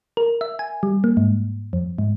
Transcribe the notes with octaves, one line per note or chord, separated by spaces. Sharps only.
A#4
E5
G#5
G3
A#3
G#2
F2
G#2